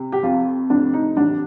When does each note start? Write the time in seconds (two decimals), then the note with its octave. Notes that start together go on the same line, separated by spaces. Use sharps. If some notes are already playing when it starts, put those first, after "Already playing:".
Already playing: C3
0.12 G4
0.23 F2 F4
0.70 F1 D4
0.94 D#4
1.16 A1 D4